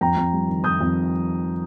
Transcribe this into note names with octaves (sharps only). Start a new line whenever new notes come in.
F2 G5 A#5
F2
G3
D#3
F2 D#6 G6
F2